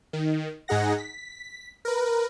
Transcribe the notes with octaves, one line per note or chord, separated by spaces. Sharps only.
D#3
G#2 D#4 G#4 F#5 A#6
B6
A#4 B4